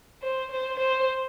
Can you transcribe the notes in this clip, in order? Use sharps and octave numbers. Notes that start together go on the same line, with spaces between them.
C5
C5
C5